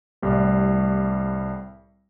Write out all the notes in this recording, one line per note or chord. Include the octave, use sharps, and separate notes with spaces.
C2 A2 G3